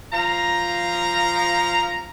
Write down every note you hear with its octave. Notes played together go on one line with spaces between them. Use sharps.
F3 F5 A#5